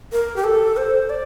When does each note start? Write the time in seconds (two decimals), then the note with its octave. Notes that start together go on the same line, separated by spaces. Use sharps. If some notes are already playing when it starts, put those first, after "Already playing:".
0.12 A#4
0.36 G4
0.44 A4
0.77 C5
1.10 D5